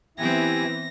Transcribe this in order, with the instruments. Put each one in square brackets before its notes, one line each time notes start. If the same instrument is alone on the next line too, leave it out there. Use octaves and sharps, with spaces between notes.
[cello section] E3 [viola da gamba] B3 C4 [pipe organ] E4 G4 G#5 [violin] A#6